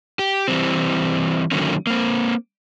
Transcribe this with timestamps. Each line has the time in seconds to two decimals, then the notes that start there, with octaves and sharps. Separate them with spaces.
0.19 G4
0.48 E3 G3 C4
1.52 D3 D#3 F#3 A3 A#3 C#4
1.87 A#3 C4